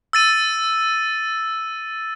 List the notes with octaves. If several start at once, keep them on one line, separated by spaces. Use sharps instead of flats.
E6 A6 D#7